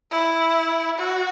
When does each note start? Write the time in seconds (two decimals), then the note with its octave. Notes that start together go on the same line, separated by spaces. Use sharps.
0.11 E4
0.98 F#4